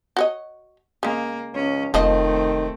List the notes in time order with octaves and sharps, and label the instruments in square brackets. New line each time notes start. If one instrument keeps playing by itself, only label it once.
[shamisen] F#4 C#5 D#5
[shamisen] C#3 G#3 [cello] A#3
[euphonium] C#2 [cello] C#4
[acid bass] F1 [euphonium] D#3 [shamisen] F3 D#4 D#5 [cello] A3 C4